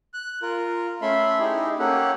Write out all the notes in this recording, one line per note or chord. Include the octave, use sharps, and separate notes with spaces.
F#6
F4 A#4
A3 C#4 A4 E5 B5 C6
D#4 E4 G4 G#4
A#3 C#4 G4 A4 F#5